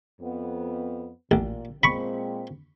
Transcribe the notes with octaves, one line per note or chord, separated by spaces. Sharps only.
F2 B3
A1 A#2
A#2 G#3 C4 B5 C#6